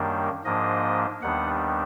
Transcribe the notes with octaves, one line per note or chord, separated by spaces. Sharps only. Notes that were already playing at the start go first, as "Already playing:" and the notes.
Already playing: F#2 D#3 G3 A#3 D4
G#2 F3 A#3 D4 D#5
D#2 D#3 G3 B3 D4 F#5